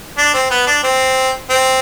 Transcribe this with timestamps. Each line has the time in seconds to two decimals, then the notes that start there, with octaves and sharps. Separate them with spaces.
0.18 D4
0.34 C4
0.51 B3
0.67 D4
0.84 C4
1.50 C4